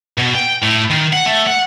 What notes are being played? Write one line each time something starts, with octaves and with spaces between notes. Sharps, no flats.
B2
G5
A2
D#3
F#5
A3
F#5